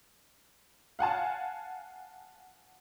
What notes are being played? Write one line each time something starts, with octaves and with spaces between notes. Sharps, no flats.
F5 F#5 G#5 A5